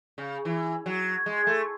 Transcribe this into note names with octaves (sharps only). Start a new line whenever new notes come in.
C#3
E3
F#3
G#3
A3